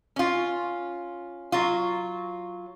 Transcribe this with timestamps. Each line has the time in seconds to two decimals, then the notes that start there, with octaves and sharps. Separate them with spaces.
0.16 C#4 F4
1.52 F#3 F4